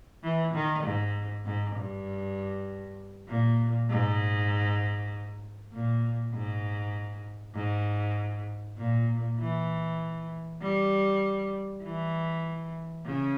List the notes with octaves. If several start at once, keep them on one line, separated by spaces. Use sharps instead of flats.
E3
D#3
G#2
G#2
G2
A#2
G#2
A#2
G#2
G#2
A#2
E3
G3
E3
C#3